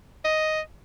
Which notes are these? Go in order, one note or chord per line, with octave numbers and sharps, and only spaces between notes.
D#5